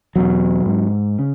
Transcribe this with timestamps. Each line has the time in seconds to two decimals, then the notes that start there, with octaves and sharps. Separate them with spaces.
0.16 E2 B2 F#3
0.66 G#2
1.19 C#3